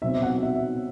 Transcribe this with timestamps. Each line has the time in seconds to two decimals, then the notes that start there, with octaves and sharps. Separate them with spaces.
0.02 B2 F#3 C4 E5
0.23 F#5
0.43 E5